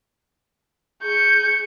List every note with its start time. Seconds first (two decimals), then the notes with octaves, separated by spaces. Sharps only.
1.02 G#4 C#6 G6